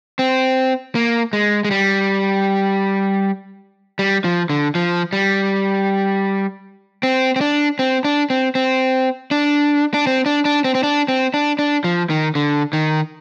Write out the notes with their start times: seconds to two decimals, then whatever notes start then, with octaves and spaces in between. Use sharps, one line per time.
0.19 C4
0.95 A#3
1.33 G#3
1.65 G#3
1.71 G3
3.99 G3
4.24 F3
4.50 D3
4.75 F3
5.13 G3
7.03 C4
7.36 C4
7.41 D4
7.79 C4
8.05 D4
8.30 C4
8.55 C4
9.31 D4
9.94 D4
10.07 C4
10.26 D4
10.45 D4
10.64 C4
10.75 C4
10.83 D4
11.08 C4
11.34 D4
11.59 D4
11.84 F3
12.10 D#3
12.35 D3
12.73 D#3